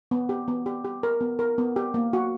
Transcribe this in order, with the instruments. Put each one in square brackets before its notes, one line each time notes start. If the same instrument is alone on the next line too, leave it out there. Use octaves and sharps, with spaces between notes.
[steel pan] B3
G4
B3
G4
G4
A#4
B3
A#4
B3
G4
A#3
F#4